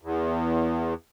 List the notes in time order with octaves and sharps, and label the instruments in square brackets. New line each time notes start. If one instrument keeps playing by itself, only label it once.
[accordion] E2